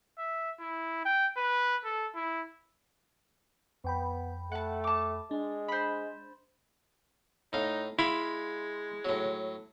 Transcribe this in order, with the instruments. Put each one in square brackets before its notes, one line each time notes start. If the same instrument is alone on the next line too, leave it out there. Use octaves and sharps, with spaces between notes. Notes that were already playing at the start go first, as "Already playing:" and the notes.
[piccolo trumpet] E5
E4
G5
B4
A4
E4
[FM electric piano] F2 G5 B5 [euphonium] B3
[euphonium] A3 [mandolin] F#5 A5
[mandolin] A5 D6
[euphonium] G#3 [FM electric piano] D4
[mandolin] C5 B5
[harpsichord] A2 F5 [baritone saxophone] D#4
[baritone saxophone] G#3 [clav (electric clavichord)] E4 [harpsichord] F5 B5 C6
[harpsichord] A2 F#3